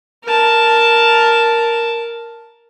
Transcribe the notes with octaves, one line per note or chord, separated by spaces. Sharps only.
A#4 A5